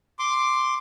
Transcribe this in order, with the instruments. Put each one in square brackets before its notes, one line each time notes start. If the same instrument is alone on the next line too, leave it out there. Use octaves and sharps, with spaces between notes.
[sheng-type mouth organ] C6 D6